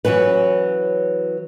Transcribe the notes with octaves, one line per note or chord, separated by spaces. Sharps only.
E3 F#3 C#4 B4